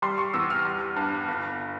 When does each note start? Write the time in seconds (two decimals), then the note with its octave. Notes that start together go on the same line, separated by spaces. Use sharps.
0.02 G3 C6
0.18 C#6
0.34 E2 E6
0.50 F6
0.65 G3
0.96 G2
1.28 G1